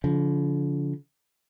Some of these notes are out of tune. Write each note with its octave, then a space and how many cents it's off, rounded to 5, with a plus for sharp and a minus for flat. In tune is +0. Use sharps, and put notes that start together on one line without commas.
D3 -45 F3 +0